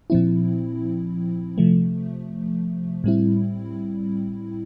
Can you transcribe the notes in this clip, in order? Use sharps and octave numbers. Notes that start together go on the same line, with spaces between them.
A#2 F3 C4 E4
C3 F3 A3
A2 G3 C4 E4